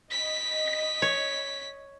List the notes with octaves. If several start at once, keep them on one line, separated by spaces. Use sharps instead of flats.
D#5 B6
C#5